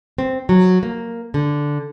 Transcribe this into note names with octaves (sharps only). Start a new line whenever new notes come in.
C4
F#3
A#3
D3